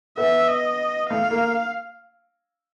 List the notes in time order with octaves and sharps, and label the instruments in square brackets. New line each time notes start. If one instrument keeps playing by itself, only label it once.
[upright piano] B3 [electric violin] E5
[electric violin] D#5
[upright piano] A3 [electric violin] F5
[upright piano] A#3